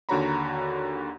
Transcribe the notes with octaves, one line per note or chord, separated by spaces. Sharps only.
D#2 D3 F#4 C#5 A#5 B5